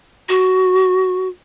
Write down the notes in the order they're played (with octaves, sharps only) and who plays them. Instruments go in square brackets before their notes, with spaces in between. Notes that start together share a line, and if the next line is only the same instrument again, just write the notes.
[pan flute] F#4